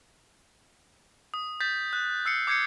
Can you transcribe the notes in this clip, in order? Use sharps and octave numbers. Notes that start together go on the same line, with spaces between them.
D#6
G6 A6 B6
F#6
E6 C7 C#7
D6 G6 G#6 C7 C#7